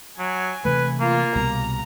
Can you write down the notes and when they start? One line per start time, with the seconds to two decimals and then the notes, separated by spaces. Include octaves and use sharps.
0.19 F#3 G#5
0.65 C3 E3 A3 B4
1.00 A#3 F4
1.35 C2 B2 G3 A#5